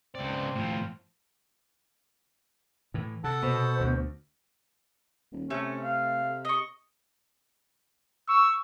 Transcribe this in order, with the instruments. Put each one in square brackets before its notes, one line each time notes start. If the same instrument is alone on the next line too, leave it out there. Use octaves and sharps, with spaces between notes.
[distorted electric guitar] C#2 D5 [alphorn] C4
[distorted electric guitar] A2 F3
[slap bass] A2 E3
[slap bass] C3 [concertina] A4 F#5 A5
[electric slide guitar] B2 [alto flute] C5
[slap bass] D2
[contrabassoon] D#1
[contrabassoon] C3 [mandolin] A3 [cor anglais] C#4
[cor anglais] F5
[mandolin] D#5 C#6
[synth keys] C#6 [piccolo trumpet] E6